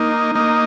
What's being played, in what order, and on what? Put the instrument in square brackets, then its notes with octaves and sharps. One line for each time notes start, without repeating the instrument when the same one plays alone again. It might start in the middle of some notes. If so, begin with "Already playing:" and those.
Already playing: [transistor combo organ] A#3 D#4
A#3 D#4